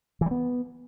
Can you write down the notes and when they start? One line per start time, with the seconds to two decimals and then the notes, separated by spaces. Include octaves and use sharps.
0.21 E3
0.26 G3
0.31 B3